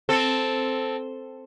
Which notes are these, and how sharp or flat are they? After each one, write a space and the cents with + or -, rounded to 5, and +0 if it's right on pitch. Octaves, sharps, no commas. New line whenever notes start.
C4 +0 A4 +0